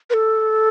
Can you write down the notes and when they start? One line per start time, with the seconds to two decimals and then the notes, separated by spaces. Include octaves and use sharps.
0.10 B4
0.14 A4